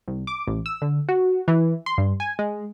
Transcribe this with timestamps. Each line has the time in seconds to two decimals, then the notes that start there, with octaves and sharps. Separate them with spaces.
0.08 C2
0.27 D6
0.47 A1
0.66 E6
0.82 D3
1.09 F#4
1.48 E3
1.86 C6
1.98 G2
2.20 G#5
2.39 G#3